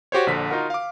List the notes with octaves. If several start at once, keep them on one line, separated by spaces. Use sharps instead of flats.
F#4 G4 C5 C#5
A#1 D3 B6
D#4 F4 F#4 A#4 F#5
F5 D6